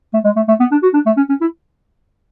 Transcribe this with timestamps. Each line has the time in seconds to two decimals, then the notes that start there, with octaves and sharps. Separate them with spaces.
0.14 A3
0.24 G#3
0.36 A3
0.48 A3
0.60 B3
0.71 D4
0.83 F#4
0.94 D4
1.06 A3
1.17 C#4
1.29 C#4
1.41 E4